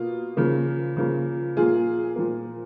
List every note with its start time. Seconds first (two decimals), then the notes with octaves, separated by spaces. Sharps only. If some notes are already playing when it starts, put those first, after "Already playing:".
Already playing: B2 A#3 F4
0.37 C#3 F3 A#3
0.97 C#3 F3 A#3
1.57 A#2 F3 A#3 F4 G#4
2.16 A#2 F3 A#3